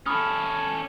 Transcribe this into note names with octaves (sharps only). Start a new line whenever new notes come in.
C#4 A4 B5 D#6 F6